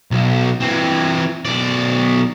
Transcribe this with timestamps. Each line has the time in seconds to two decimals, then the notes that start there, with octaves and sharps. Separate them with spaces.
0.11 B1
0.61 E3 C4
1.45 B1 D5